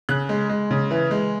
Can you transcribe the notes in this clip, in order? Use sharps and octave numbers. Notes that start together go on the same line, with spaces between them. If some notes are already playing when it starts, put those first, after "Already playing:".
C#3 F#6
G#3
G#3
C#3
E3
G#3